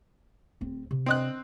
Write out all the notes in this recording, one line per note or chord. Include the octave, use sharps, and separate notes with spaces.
D1 C4
C3
C4 D#5 F#6